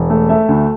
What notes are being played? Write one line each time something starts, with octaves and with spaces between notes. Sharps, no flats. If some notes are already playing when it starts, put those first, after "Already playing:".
Already playing: E1
A3
A3 E5
D2